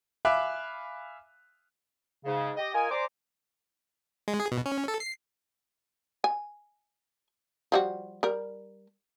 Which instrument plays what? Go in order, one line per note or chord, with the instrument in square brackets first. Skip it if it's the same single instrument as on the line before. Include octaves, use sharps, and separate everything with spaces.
[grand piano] E5 F5 G#5 B5 D6 F#6
[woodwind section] G#2 C#3
G4 D#5
F4 A#4 D#5 G#5
C5 D5 G#5 A#5 C6 D6
[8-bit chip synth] G#3
G#4
B2
C#4
A4
C7
[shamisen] G#5
F3 G3 F#4
G3 A#4